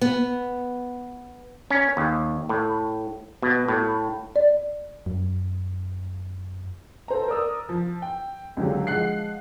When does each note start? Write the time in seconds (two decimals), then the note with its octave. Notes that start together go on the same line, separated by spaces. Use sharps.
0.01 B3
1.70 C#4
1.97 D#2
2.49 A2
3.42 B2
3.68 A2
4.36 D5
5.06 F#2
7.08 A4 C5 A#5
7.28 A#4 D5 D#6 E6
7.69 F3
8.02 G5
8.57 C#2 D3 F#3 G4
8.87 F3 G#3 F5 F#5 F#6 C7